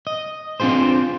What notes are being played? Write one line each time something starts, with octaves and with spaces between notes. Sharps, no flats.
D#5
C4 D4 F4 G#4 C5